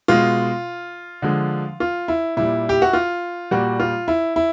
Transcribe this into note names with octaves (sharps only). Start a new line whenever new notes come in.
B2 G#3 F4
D3 F3 G#3
F4
E4
A#2 G3 E4
G4
F#4
F4
A#2 G3 F#4
F4
E4
E4